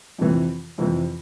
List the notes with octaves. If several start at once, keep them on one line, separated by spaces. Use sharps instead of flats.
F2 C3 E3
F2 C3 E3